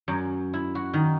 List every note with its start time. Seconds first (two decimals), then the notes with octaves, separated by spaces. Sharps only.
0.08 F#2
0.53 E4
0.75 F#4
0.93 D#3